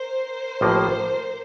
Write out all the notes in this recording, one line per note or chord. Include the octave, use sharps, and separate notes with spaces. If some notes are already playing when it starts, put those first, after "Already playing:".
Already playing: A#4 C5
A1 A2 F3 A#3